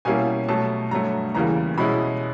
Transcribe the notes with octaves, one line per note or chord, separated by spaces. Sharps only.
B2 G3 A#3 C#4 E4 G#5
B2 F#3 A3 A5
G2 D3 F#3 A3 A#5
E2 C#3 E3 G3 A#3 A#5
B2 G#3 C#4 E4 B5